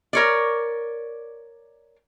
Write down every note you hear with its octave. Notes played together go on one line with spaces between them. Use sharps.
A#4 C#5 D5